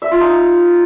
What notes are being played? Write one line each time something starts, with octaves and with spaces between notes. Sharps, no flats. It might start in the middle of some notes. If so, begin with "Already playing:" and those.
E5
F4
D#4